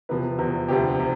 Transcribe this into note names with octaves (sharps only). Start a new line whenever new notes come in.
E2 C3 F3 B4
E2 C3 F3
D2 C3 F3 G4
C3